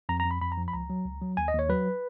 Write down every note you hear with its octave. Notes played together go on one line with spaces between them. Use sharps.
F2 A#5
A#5
F2
B5
F2 B5
A#5
F3
B5
C#2 A#5
F#3
C#2
F#3
D#2 G#5
D#5
D#2
C#5
F#3 B4